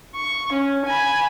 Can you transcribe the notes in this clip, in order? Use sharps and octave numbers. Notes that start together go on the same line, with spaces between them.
C#6
C#4
G#5 B5